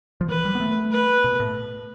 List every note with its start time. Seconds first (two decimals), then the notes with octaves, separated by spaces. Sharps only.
0.21 F3
0.28 E3 B4
0.45 G3
0.55 B3
0.60 A3
0.92 B4
1.24 B2
1.40 A2